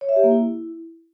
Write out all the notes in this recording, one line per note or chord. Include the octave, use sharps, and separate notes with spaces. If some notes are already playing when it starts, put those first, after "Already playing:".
C#5
E5
G4
A#3
E4